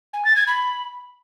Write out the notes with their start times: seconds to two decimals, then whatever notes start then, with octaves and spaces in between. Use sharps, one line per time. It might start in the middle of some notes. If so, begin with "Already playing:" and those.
0.13 G#5
0.25 A6
0.36 G#6
0.47 B5